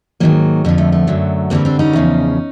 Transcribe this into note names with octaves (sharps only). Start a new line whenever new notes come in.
G#2 D#3 F#3 A#3
F2 D3 F3 A#3
A3
A3
F#2 D3 F#3
G2 D3 G3 A#3 C4
C4 D4
C#4 D#4
E2 C#3 F3